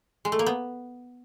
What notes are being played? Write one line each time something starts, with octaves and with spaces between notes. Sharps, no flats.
G#3
A3
A#3
B3